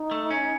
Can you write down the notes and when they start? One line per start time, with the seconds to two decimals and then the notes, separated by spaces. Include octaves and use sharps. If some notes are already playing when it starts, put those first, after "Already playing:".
Already playing: D#4
0.11 A3
0.30 C#4